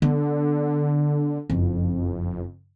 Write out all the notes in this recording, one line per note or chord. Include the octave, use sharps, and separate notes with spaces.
D3 B3
F#1 F2